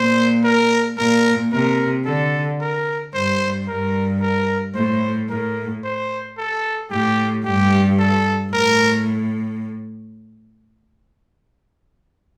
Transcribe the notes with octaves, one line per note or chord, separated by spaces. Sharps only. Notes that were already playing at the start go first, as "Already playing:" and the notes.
Already playing: A#2 C5
A#4
A#2 A#4
C3 A#4
D3 A4
A#4
G2 C5
G2 A#4
A#4
A2 C5
A2 A#4
C5
A4
A2 G4
G2 G4
A4
A2 A#4